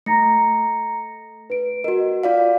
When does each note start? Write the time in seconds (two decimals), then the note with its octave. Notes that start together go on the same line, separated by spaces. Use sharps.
0.06 A3 A#5 A#6 C#7
1.50 B4 D7
1.84 F#4 A#4 D#5
2.23 F4 D5 F5